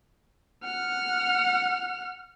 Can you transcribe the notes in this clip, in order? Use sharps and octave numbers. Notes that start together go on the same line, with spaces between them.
F#5 F6